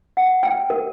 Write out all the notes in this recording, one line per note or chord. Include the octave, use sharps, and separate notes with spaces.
F#5
G5
A#4